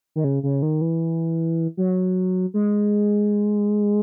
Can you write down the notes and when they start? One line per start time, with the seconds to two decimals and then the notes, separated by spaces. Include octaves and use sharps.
0.16 D#3
0.24 C#3
0.43 C#3
0.62 D#3
0.81 E3
1.77 F#3
2.54 G#3